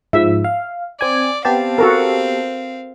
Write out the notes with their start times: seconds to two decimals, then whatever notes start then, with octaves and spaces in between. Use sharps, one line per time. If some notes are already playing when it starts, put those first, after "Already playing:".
0.13 G#2 F3 E5
0.44 F5
1.01 C4 D5 G#5
1.45 B3 C4 G4 F5 A5
1.78 F#4 A4 A#4